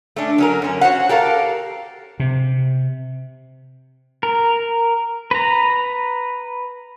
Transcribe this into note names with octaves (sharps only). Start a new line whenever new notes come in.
A3 C#4 D4
F#3 C#4 A#4
F#2 C#4
F#4 C5 C#5 F#5
G4 A4 A#4 F5
C3
A#4
B4 A#5